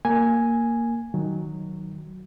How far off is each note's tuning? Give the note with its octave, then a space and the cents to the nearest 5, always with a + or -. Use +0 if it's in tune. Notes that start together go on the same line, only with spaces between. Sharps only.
A#3 -5 G#5 +0
D#3 +0 F#3 +0